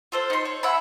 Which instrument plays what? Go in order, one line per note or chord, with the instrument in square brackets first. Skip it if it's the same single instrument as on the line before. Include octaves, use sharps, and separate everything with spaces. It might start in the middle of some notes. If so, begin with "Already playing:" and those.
[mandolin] F4 A4 C5
D#4 C6
C#5
E5 F#5 G#5 B5